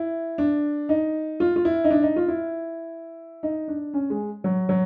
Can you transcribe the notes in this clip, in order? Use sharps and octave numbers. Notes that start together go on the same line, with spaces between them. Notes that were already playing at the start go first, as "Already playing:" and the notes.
Already playing: E4
D4
D#4
F4
F4
E4
D#4
D4
D#4
F4
E4
D#4
D4
C#4
G#3
F#3
F#3